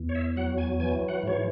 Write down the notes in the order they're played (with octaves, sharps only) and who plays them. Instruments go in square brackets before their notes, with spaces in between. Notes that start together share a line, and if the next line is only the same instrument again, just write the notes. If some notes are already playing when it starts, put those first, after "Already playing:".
Already playing: [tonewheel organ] E2
C#5
E5
F#3 F#5
G#5
E3 G#5
F#5
G#2 C#5